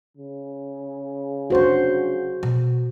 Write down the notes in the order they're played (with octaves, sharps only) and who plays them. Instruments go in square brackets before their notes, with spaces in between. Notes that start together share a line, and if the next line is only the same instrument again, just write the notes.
[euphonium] C#3
[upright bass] F1 D4 [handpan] F#4 C5
[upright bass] B2